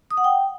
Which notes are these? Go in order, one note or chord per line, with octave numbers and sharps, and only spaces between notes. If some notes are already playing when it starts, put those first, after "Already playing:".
D#6
F#5
G5